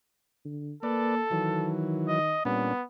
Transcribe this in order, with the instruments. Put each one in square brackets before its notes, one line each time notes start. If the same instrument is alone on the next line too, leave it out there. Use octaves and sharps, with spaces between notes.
[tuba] D3
[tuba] A#3 [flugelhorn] A4 [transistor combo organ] B4 D5
[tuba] D#3 [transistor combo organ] E3 F#3
[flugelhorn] D#5
[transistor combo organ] A#2 C#4 D4 [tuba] G3 [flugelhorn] B3